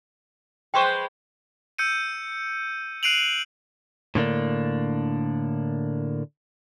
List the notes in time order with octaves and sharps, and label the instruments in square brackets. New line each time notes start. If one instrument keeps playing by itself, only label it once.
[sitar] G#3 B4 C5 [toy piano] G5 C6 C#6
[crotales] E6 G6 C#7 D#7
F#6 C7 D7 D#7 F7 F#7
[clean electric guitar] A2 D3 A#3 D4